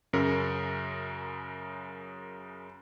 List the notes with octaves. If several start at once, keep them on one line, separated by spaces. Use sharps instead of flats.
F#2 C#3 A#4